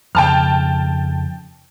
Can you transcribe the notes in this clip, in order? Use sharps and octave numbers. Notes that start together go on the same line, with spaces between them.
F2 C#3 G5 A5 F6